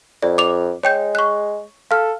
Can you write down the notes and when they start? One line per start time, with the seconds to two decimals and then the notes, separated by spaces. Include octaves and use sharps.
0.23 F2 D5
0.38 D6 F7
0.83 G#3 C#5 G5 G6
1.15 C#6 F#6
1.91 A4 F5 F6